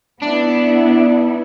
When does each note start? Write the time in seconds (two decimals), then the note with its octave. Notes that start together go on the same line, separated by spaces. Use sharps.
0.22 B3 D4 E4